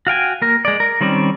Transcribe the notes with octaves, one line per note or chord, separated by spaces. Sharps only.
F#4 F5 G5 G#5
A#3 A#4
G#3 D5
A#4
D#3 G3 C4 C#4 D5